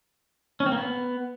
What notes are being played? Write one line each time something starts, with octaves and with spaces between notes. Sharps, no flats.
C#4
C4
A#3
B3